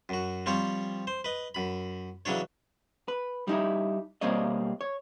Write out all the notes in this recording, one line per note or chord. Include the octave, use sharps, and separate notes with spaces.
F#2 F#4
F3 G3 C4 C#5
C5
B4 D#5
F#2 B5
C#3 E3 F#3 D4 C#5
B4
G3 D#4 E4
B2 G3 A#3 C4 C#5 D#5
C#5